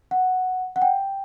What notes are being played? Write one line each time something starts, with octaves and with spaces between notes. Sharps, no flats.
F#5
F#5
G5